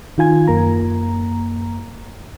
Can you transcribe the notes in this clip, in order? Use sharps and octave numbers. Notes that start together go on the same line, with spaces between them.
D#3 F4 G#5 G#6
F#2 A#3 A#5